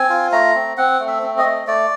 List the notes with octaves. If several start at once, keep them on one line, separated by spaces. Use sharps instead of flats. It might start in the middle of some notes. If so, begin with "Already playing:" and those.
Already playing: C4 G#5
F4
A3 A#5
C4
C4 F#5
A3
E5
C4
D#5
A3
A3 D5